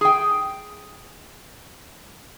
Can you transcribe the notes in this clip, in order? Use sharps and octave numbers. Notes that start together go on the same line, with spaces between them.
G#4 G5